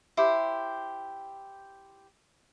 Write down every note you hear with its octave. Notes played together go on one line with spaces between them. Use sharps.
E4 G4 C5